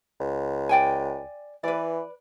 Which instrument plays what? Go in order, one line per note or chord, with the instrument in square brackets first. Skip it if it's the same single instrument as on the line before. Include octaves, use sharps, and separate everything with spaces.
[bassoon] C#2
[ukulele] D5 G5 G#5
[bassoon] E3 [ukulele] B4 D5